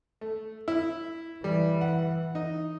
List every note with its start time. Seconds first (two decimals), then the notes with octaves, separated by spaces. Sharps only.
0.21 A3
0.68 E4
1.44 E3 G3
1.81 F#5
2.35 D#4